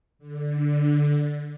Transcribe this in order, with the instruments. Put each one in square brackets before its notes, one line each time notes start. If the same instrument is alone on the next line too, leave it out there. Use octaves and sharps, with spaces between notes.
[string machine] D3